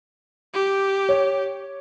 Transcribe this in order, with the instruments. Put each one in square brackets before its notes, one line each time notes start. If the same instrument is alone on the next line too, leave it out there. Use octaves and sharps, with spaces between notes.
[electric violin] G4
[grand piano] C#5